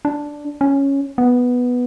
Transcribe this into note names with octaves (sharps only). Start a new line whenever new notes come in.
D4
C#4
B3